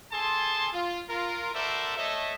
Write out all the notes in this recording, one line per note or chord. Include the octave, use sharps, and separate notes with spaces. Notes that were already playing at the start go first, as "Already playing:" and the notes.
G#4 A4 G#5 A5 C6
F4
F4 A#4
F#4 A4 A#4 C5 D5 E5
A3 A4 C#5 D#5 E5